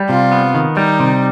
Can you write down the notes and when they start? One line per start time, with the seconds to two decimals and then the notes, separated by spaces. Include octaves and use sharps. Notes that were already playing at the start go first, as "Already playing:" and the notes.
Already playing: G3
0.09 C3 F4
0.32 B3
0.55 D#3
0.76 G3 D#4
1.00 C3